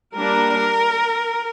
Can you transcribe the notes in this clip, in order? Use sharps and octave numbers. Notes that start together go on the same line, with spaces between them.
G3 A#3 D4 A#4